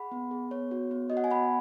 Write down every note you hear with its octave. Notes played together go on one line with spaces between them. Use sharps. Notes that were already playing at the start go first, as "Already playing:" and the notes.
Already playing: G#4 F#5 B5
B3
G#4
B3 C#5
F#4
B3
F#4 D#5
F#5
G#5
B3 F#5 B5